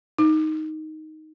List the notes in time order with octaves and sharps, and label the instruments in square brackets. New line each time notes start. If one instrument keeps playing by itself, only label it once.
[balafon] D#4